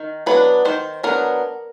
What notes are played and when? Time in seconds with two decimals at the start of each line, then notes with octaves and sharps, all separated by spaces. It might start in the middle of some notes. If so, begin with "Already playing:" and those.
Already playing: D#3
0.26 F#3 B3 D4 B4
0.65 D#3 C5
1.03 F#3 B3 D4 A#4